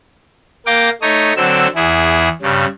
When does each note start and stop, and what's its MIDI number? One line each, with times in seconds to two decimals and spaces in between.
0.66 0.90 58
0.66 0.90 77
0.66 0.90 79
0.66 0.90 86
0.66 0.90 94
1.02 1.33 57
1.02 1.33 63
1.02 1.33 73
1.02 1.33 87
1.36 1.67 50
1.36 1.67 54
1.36 1.67 60
1.36 1.67 88
1.75 2.29 40
1.75 2.29 64
1.75 2.29 68
2.42 2.65 43
2.42 2.65 49